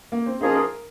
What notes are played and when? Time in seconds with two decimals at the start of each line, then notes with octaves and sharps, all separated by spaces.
0.12 A#3
0.26 C4
0.41 F3 A#3 C#4 D#4 G#4
0.55 A#4